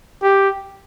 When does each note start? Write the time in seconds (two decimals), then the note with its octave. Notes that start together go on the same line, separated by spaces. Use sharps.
0.23 G4